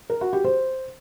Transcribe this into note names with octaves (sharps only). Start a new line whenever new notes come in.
A#4
F#4
G4
C5